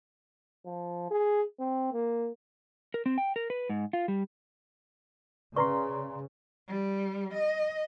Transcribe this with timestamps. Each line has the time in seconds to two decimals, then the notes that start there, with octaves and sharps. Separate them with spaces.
0.66 F3
1.11 G#4
1.59 C4
1.93 A#3
2.94 A#4
3.06 C4
3.18 G5
3.36 A#4
3.50 B4
3.69 G#2
3.93 F4
4.08 G3
5.56 C#3 B4 D5 A#5 C6 C#6
6.68 G3
7.34 D#5